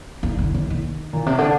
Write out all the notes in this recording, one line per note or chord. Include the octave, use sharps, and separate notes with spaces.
D3
D3
D#3
D#3
A#2
C3
D3